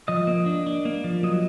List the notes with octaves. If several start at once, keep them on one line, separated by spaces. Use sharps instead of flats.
F3 D#5
A#3
D4
D4
A#3
F3
F#3 D#5